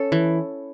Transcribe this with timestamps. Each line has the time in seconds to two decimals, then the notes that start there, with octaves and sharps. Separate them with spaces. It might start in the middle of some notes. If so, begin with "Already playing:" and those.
Already playing: C#4 A4
0.12 E3